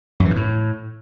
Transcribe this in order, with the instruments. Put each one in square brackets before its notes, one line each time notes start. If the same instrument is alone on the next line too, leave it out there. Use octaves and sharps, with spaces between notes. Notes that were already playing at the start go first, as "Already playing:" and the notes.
[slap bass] F#2
E3
G#2
A2